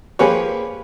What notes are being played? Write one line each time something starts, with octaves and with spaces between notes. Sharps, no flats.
F3 A#3 G4 G#4 B4 C#5